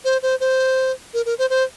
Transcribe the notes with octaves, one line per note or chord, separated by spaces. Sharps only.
C5
C5
C5
A#4
A#4
C5
C5